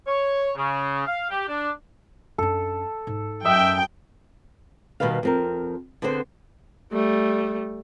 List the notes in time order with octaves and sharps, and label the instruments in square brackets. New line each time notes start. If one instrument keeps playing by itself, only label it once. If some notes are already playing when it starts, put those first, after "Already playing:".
[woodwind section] C#5
C#3
F5
G4
D4
[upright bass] F#2 D4 [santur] A4
[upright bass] G#2
[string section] F#2 G5 [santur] D#5 [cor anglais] E5
[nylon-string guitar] B2 D#3 G3 B4 F5
F2 C4 A#4
D3 B3 C4 G#4 C5
[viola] G3 A3